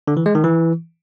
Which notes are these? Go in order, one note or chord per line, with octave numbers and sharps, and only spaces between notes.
D3
E3
G#3
D#3
E3